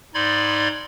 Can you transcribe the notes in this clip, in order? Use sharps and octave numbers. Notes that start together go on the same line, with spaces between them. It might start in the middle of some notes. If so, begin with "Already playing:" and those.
G#2 D#4 D5 B5 C6 G#6